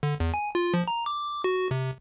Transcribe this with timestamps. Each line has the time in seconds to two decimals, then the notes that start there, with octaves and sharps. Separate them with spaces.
0.03 D3
0.20 E2
0.34 G#5
0.55 F4
0.74 F3
0.88 A#5
1.06 D6
1.44 F#4
1.71 C3